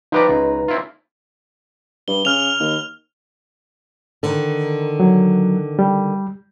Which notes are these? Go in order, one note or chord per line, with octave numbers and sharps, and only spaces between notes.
F3 D#4 G4 B4 D5 A#5
C#2
C4 E4 F4
G2 G7
C#3 F6 F7
D#2
D3 D#3
F#3
G3